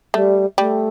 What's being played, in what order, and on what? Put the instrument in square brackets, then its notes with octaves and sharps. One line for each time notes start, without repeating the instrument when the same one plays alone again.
[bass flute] G3 [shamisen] A3
[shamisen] G3 [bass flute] A3